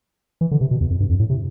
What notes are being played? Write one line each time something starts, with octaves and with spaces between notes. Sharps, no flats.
E3
D3
C3
B2
E2
F2
G2
F2
A2
C3